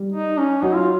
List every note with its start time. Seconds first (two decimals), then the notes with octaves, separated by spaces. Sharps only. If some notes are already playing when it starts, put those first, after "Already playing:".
Already playing: G3
0.12 D#4
0.38 C#4
0.62 F#3 D#4
0.75 F4